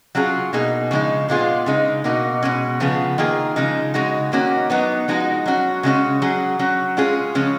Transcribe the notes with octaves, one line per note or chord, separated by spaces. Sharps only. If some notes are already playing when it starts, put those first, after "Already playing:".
F#3 C#4 F4 G#4
B2 A#3 D#4 G#4
C#3 F3 G#3 D#4
A#2 G#3 B3 F4 G#4
C#3 G#3 D#4
B2 A#3 D#4 F#4
B2 G#3 C#4
C#3 F3 B3 F4 G#4
D#3 A#3 F4 G#4
C#3 F3 G#3 D#4
C#3 G#3 D#4 F#4
D#3 A#3 C#4 F#4
F#3 B3 D#4
F3 G#3 D#4 F#4
F#3 C#4 F#4
C#3 G#3 C#4 F#4
F#3 C#4 G#4
F#3 C#4 F#4
G#3 C#4 F4 G#4
C#3 F3 G#3 C#4